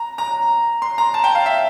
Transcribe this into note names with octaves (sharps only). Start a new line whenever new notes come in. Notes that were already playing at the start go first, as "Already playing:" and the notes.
Already playing: A#5
A#5
C6
A#5
A5
G5
F5
E5